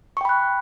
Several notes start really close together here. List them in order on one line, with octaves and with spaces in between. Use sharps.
C#6 G5 B5 F#6